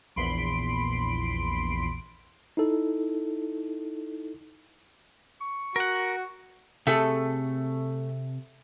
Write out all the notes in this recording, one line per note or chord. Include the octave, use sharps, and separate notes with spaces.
A#1 E2 B5 C6 D7
D#4 E4 A4
C#6
F#4 A#4 F#5
C3 A3 G#4 A4